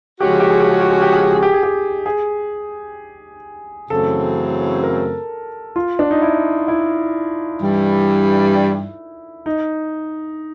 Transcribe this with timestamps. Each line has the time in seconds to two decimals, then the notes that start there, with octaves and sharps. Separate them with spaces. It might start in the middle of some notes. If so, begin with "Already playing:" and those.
0.20 C#3 F3 G#3 C#4 F#4 G4
0.30 G#4
0.40 G4
0.50 G#4
0.60 G4
0.71 G#4
0.81 G4
0.91 G#4
1.02 G4
1.12 G#4
1.23 G4
1.33 G#4
1.43 G4
1.53 G#4
1.63 G4
2.06 G#4
3.90 F#2 C#3 E3 A3 C4 A4
4.83 A#4
5.76 F4
5.99 D4
6.11 D#4
6.22 E4
6.68 E4
7.61 G2 E3 G3
9.46 D#4